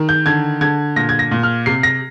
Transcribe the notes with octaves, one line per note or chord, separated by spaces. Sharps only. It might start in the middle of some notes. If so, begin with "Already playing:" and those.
Already playing: D#3
G6
D3 G#6
D3 G#6
A#2 A#6
G#6
A#6
A#2
F6
C3 C7
A#6